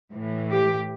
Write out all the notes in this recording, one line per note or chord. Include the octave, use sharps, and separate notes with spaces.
A2 E3
G4